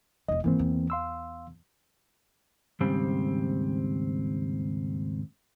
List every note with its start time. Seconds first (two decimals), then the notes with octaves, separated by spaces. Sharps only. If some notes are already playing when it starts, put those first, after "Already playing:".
0.28 E1 E3 D#5
0.44 G#2 D#3 E3 A#3 C4
0.59 E2
0.90 F5 C6 E6
2.80 D#2 G#2 C#3 G3 C4